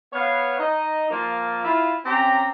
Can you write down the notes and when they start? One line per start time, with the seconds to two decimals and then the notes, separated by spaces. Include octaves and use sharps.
0.13 B3 C#5 F5
0.59 D#4 D#5
1.10 F3 A#3 F4
1.64 E4 F4
2.06 C4 C#4 G4 A#5